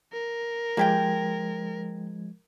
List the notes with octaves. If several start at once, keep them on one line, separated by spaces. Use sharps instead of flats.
A#4
F3 G#3 A#3 G4 G5 G#6